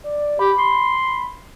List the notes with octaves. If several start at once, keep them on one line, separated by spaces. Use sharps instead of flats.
D5
G4 B5
C6